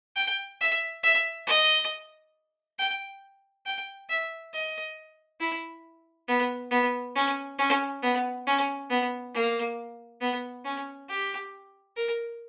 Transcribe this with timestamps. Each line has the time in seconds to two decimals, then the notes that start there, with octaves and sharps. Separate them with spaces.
0.16 G5
0.61 E5
1.03 E5
1.47 D#5
2.79 G5
3.66 G5
4.10 E5
4.54 D#5
5.40 E4
6.28 B3
6.71 B3
7.16 C#4
7.58 C#4
8.03 B3
8.47 C#4
8.90 B3
9.34 A#3
10.21 B3
10.65 C#4
11.09 G4
11.96 A#4